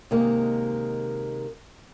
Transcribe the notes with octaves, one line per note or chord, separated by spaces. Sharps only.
C3 D#3 G#3 A#3